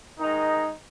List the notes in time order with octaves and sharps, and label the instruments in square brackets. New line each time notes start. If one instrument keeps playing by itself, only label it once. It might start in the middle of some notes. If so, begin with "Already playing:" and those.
[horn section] D#3 G#3 D#4